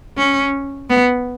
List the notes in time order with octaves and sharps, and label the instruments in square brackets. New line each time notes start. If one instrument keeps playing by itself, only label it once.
[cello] C#4
B3